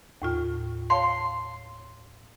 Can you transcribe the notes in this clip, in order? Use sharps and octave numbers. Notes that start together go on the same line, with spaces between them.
D#2 A2 F4
C#5 F5 A5 C6